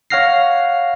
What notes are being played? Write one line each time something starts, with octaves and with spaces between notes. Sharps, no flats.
C#5 F5 F#5 F6 A#6 C7